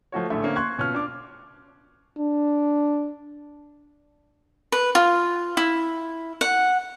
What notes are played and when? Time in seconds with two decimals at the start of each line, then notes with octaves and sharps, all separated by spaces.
0.12 F3 A3 F#4 C#5
0.30 A#1 A2 D3 A3 E5
0.43 D3 A#3 C4 C#4
0.56 C6 C#6 F#6 G#6
0.78 B2 C#4 F4 F6
0.95 D4 D6
2.17 D4
4.72 B4
4.95 F4
5.57 E4
6.41 F#5